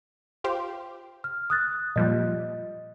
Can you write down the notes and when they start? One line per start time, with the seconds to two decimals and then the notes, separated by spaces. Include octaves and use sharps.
0.44 F4 G4 C5
1.24 F6
1.50 D#6 F#6 A6
1.96 A#2 F3 G3 D#5